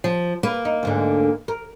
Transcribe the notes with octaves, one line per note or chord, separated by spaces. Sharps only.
F3
A#3 B4
D#4
D2 G#2 D3
A#4